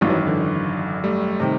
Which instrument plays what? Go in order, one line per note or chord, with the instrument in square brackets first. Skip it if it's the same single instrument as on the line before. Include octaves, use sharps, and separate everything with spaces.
[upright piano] G#1 F#2 D#3 [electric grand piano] F3 G3
[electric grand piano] E3 F#3
D3 E3
G3 A3
[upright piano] C3 D#3